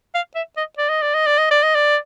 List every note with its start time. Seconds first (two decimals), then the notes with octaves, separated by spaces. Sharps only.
0.15 F5
0.35 E5
0.57 D#5
0.78 D5
0.89 D#5
1.02 D5
1.14 D#5
1.26 D5
1.38 D#5
1.51 D5
1.63 D#5
1.75 D5